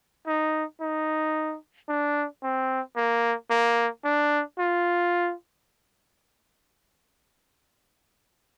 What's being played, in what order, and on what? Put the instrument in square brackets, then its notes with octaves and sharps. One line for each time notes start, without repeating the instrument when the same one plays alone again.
[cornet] D#4
D#4
D4
C4
A#3
A#3
D4
F4